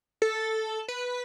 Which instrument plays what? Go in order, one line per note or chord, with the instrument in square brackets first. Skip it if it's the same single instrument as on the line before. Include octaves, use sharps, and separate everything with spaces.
[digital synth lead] A4
B4